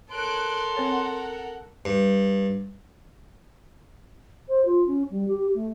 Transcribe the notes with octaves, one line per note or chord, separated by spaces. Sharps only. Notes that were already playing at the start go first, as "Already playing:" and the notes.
A4 A#4 C#5 C6 F#6 D7
C4 C5 C#5 F#5
G2
C5
F4
C#4
G3
G4
A3